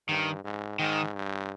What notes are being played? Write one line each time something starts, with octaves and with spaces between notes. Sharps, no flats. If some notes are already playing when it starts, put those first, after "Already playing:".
G2 D#3
G#2
G#2 D#3
G2